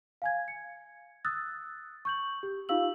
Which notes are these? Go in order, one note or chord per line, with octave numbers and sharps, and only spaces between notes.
F5 G#5 G#6
C#7
D#6 E6 F#6 A6
C#6 G6 F#7
G4
D#4 F4 G4 F5 E6 F#7